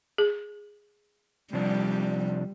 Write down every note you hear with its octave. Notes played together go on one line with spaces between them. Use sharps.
G#4
C3 F3 G3 D4